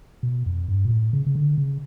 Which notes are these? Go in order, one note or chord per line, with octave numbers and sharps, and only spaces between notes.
B2
F2
G2
A#2
A2
C#3
C#3
D3
C#3